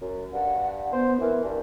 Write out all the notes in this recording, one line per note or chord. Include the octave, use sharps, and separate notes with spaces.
F#2
G2 F#5
B3 C5
E3 A#4
G2